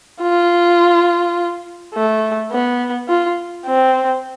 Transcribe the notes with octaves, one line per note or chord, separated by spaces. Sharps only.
F4
A3
B3
F4
C4